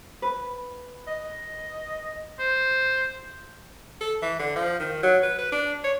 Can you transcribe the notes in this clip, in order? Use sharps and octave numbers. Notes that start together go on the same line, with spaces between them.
B4
D#5
C5
A4
E3
D3
F3
D#3
F#3
B4
B4
D4
C#5